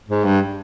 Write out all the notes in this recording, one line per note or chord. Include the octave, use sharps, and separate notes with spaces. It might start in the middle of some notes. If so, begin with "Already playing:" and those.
G#2
G2